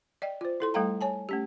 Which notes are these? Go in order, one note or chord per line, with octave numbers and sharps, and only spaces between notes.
D5 D#5 G5
F4 C5
E4 A4 C6
G3 A3 A4 F5 G5 A#5
C#5 G#5 A5
A3 C#4 G4